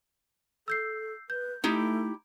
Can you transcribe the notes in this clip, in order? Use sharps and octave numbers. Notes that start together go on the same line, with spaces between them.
A4 E6 G6 C7
B4 G6
A3 D#4 E4 G4